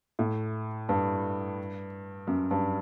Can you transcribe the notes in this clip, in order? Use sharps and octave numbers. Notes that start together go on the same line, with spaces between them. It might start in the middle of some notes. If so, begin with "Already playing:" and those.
A2
G2
F#2
G2